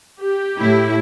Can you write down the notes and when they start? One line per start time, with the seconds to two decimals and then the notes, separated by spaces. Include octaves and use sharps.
0.20 G4
0.59 A2 E4